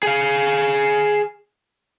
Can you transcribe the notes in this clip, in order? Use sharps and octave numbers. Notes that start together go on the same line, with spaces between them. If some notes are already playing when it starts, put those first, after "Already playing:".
G#4 F5